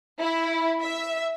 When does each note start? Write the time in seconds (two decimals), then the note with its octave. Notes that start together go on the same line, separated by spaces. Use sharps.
0.19 E4
0.82 E5